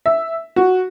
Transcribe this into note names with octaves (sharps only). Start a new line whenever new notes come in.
E5
F#4